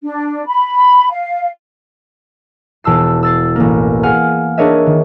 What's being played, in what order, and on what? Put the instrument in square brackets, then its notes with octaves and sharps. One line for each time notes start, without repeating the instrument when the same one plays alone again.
[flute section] D4
B5
F5
[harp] E1 A5 E6 C7
E6 A6 C7
A1 A#3
G#4 F5 F#5 G#5 F6
D4 G#4 A#4 C#5 D#5 E5
D#3